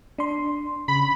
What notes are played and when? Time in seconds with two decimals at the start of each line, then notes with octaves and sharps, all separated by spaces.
0.18 D4 C6
0.88 C#3 B5